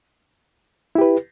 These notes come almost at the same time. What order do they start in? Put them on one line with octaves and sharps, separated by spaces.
E4 G4 B4